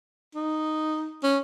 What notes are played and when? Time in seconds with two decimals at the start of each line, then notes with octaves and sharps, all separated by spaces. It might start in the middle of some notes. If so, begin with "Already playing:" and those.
0.35 D#4
1.23 C#4